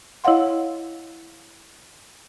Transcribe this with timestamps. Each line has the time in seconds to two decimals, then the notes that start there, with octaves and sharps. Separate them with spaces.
0.24 E4 C#5 D#5 F5 F#5 C6